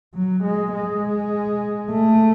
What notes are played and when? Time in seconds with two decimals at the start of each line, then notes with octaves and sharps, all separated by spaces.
0.15 F#3
0.44 G#3
0.73 G#3
1.90 A3